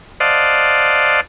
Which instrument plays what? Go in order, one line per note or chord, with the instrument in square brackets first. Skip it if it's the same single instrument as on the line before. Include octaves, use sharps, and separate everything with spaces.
[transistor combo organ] C5 D5 D#5 F5 F#5 A5